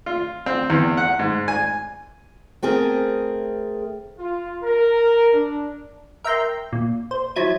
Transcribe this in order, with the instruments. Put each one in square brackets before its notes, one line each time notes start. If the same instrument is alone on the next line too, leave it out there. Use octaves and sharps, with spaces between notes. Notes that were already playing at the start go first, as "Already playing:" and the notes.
[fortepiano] F4
C4
E2
F#5
G#2
G#5
[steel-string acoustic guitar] A3 C4 G#4 A#4
[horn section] F4
A#4
D4
[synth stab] A#4 E5 G5 A#5 C6 G6
A#2
C5
F3 F#3 E4 G#6 D#7